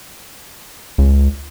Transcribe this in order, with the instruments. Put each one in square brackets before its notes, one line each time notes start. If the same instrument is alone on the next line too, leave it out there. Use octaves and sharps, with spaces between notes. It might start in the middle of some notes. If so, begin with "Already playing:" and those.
[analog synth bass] C#2